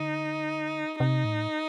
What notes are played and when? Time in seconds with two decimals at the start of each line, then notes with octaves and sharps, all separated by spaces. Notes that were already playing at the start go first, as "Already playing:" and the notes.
Already playing: D3 D#4
1.00 C3 D#4
1.25 A2